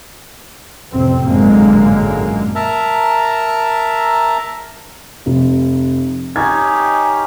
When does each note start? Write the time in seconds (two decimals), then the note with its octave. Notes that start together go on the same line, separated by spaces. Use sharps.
0.91 A1 F2 C3 C4
1.25 G#1 F#2 A#2 D3 G#3 A#3
2.56 A#4 E5 A5 A#5
5.26 F1
6.36 C#4 D#4 G4 G#6